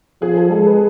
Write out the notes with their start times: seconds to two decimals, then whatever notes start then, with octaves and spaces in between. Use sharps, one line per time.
0.22 F3 G#4
0.37 A4
0.51 G#3 A4
0.66 B4